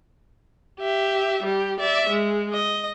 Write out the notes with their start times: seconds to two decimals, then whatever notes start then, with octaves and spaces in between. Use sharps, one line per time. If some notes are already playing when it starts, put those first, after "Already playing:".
0.80 G4 E5
1.43 G3 G4
1.80 D5 E5
2.09 G#3
2.53 D#5